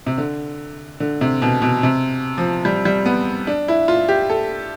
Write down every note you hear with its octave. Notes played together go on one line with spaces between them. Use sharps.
C3
D3
D3
C3
B2
B2
C3
F3
G3
G3
B3
D4
E4
F4
G4
A4